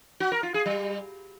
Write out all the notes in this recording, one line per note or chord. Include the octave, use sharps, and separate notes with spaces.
F#4
A#4
F4
G#4
G3